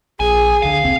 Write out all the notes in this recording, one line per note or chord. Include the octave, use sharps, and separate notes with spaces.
A#1 G#4 G#5
D2 D3 F5
D#1 B1 C4